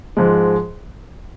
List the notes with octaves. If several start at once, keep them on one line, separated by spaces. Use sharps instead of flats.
G#2 F3 G#3